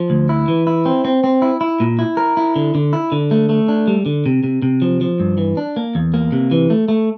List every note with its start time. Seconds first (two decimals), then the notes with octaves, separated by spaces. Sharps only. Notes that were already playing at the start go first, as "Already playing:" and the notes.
Already playing: F3
0.10 D2
0.29 E4
0.48 E3
0.67 E4
0.86 C4
1.05 C4
1.24 C4
1.42 E4
1.61 E4
1.80 A#2
1.99 E4
2.17 A#4
2.37 E4
2.56 D3
2.75 D3
2.93 E4
3.12 D3
3.31 A3
3.49 A3
3.68 D4
3.88 G3
4.06 D3
4.26 C3
4.44 C3
4.62 C3
4.82 F3
5.01 F3
5.20 G2
5.38 E3
5.57 D4
5.76 A#3
5.95 E2
6.14 A#3
6.32 C3
6.51 E3
6.70 A3
6.88 A3